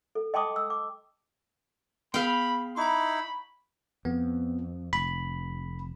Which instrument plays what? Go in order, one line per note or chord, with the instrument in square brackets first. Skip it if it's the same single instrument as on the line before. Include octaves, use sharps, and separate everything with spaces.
[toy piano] A4
D#5 G5 A5 C6 D6 D#6
E6
D6
[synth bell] B3 G#4 [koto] F5 G5 [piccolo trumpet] B5
[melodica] D#4 E4 [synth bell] A#5 C#6 [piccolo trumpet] B5
[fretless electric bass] F2 [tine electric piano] B3
[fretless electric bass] F1 [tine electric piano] B5